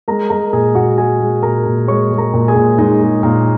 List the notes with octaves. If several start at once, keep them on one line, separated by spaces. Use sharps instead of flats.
G#3 A#4 A#5
G#3 A#4 A#5
A#2 G#4 G#5
A#2 F#4 F#5
G#3 G#4 G#5
G#3
A#2 A#4 A#5
A#2
G#3 C#5 C#6
G#3
A#4 A#5
A#2
G#4 G#5
A#2
G#3 D#4 D#5
G#3
A#2 A#3 A#4